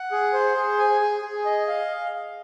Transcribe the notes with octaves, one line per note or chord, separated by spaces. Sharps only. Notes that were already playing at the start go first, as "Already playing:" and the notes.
Already playing: F#5
G#4
C5
G#4
G#5
G#4
G#4
D#5
F5